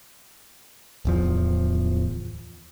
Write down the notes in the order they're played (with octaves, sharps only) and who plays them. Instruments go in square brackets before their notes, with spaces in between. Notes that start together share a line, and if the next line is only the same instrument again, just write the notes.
[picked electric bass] D1 E2 F3